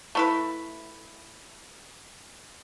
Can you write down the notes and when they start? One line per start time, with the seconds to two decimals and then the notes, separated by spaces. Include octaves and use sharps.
0.15 A3 E4 B4